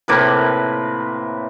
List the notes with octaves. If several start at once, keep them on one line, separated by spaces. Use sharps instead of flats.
A2 C3 A#3 B4